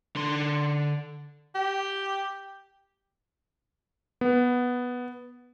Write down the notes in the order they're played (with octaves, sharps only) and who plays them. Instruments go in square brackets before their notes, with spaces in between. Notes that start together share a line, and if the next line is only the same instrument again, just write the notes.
[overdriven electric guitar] D3 C6
[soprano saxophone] G4
[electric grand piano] B3